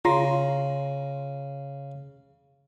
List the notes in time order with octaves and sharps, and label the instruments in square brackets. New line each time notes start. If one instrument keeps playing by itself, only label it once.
[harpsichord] C#3 [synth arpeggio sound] F4 A#5 C6